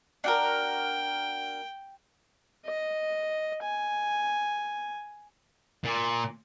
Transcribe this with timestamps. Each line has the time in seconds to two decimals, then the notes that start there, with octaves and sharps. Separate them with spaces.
0.24 D4 F#4 A#4 G5
2.66 D#5
3.63 G#5
5.84 A#2